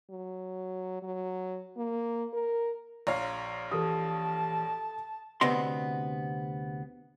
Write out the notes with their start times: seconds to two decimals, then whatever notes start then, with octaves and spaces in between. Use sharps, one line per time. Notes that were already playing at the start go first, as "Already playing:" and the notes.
0.11 F#3
1.03 F#3
1.77 A#3
2.34 A#4
3.07 A#1 C#5 F5 A#5 C6
3.71 E3 G4 A4 A5 D#6
5.41 D2 C3 B3 C4 D#5 C6